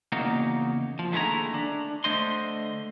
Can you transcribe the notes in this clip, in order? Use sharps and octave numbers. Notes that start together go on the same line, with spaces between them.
E2 C#3 A#3 D#4 F#4 F5
F3
D#2 D3 A3 E4 G#4 A#5
D4
D3 A3 C5 D#5 C6